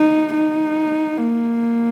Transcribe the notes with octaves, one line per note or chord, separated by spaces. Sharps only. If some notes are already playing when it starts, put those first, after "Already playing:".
Already playing: D#4
D#4
A#3